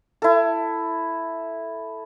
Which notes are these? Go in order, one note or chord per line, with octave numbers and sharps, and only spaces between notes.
E4 A4